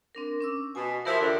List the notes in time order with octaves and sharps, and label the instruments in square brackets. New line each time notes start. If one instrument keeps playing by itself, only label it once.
[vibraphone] C4 D4 A#4
C#4 D6 E6
[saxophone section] B2 [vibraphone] G#5
[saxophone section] F3 E4 [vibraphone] G4 A#4
[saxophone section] D#2 D3 D4